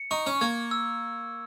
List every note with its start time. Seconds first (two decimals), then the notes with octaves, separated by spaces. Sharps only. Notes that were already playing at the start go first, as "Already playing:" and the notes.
Already playing: C#7
0.11 D#4 C#6
0.26 C#4
0.41 A#3 G#6
0.71 E6